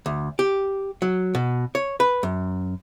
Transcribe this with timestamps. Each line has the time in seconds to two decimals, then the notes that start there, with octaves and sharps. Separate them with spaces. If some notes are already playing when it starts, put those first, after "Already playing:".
0.06 D2
0.39 G4
1.02 F#3
1.35 B2
1.75 C#5
2.00 B4
2.23 F#2